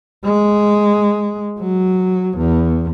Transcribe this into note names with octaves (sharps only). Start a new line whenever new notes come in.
G#3
F#3
E2